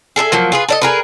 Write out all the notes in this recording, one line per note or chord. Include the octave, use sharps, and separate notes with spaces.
G#4 A4 B4 E5
F3 F#3 A#3
F4 G#4 B4
A4 D5 D#5
G#4 A#4 B4